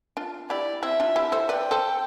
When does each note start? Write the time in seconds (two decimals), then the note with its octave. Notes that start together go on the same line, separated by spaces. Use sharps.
0.17 D4 F4
0.50 E4 G4 D5
0.83 C4 E4 E5
1.00 D4 F4
1.16 E4 G4
1.32 A4 C5
1.49 B4 D5 G5
1.71 A4 C5